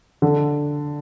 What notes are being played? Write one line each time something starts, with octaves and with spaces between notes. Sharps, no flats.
D3